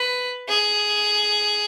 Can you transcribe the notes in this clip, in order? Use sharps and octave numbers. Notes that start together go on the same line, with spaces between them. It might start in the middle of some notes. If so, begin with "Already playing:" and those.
Already playing: B4
G#4